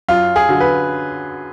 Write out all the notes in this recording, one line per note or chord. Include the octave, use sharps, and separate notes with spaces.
F#2 F4
G#4
D3 F#3
B4